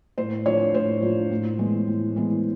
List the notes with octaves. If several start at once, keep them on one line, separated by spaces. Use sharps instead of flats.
A2 C5
F3 A#3 D4 C#5
A2 C5
F3 A#3 D4
A2
E3 G#3 B3
A2
E3 G#3 B3